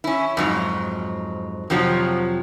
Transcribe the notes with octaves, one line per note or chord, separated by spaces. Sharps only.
C#4 E4
F2 G#2 F#3
F2 C3 F3 F#3